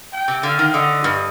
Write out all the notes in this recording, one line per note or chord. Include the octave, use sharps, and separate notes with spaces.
G5
C3
D3 F5
D#3
D3 D#5
G2